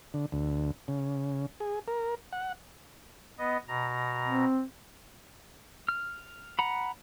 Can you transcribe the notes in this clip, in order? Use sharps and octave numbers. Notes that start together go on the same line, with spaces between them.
D3
D2
C#3
G#4
A#4
F#5
B3 D#5
B2 A#5
C4
F6
F#5 A#5 B5